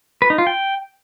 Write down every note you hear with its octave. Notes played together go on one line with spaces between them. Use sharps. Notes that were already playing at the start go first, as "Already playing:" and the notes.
B4
D#4
F4
G5